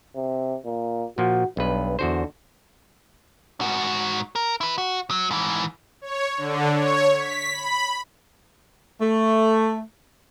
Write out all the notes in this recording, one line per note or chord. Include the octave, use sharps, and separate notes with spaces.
C3
A#2
A#2 F3 F#4
B1 G2 B4
E2 D3 F#4 C5
G#2 F#4
A#4
E4 B4
F#4
F#3
G#2 E3
C#5
D3
C#5
B6
B5
A3